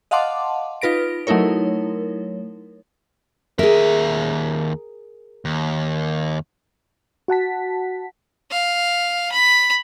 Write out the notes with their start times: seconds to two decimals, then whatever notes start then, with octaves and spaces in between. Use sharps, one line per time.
0.11 D#5 F5 F#5 A5 C6 D6
0.81 D#4 F4 B4 A#6 D7
1.27 F#3 A3 D#4 E4 A#4 C#5
3.59 D#2 G#4 A#4 E5
5.45 D#2
7.28 F#4 F#5 A5 B6
8.51 F5
9.32 B5